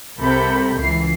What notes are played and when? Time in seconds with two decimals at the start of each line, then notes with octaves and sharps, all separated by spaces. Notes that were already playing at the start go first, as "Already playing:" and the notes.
0.19 C2 C3 A4 A#4 B5 G6
0.78 C#2 E3 C7